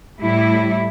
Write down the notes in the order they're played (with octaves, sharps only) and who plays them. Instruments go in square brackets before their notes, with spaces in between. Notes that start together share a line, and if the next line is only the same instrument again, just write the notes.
[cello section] A2 G3 E4